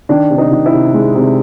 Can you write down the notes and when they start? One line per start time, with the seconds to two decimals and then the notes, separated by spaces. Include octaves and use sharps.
0.09 D#3 D4
0.30 C3
0.38 D#4
0.51 D#3
0.66 E4
0.73 C3
0.94 G#3
1.15 C3